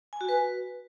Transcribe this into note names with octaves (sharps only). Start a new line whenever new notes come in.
G#5
F#4
B4